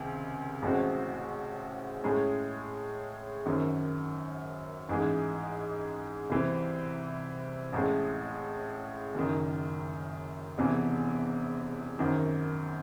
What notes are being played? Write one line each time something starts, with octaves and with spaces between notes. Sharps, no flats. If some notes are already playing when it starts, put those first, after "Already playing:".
Already playing: C#2 C3 D#3
A1 A2 G#3 C4 F#4
A2 G#3 C#4
G#1 F#2 D#3
A1 G#2 E3 G#3
C2 C3 E3 C4
A1 A2 G#3
F#1 F#2 D#3
E1 E2 C3 E3
G#1 F#2 D#3